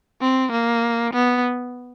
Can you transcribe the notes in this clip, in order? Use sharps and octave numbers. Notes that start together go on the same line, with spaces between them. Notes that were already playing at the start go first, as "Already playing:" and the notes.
C4
A#3
B3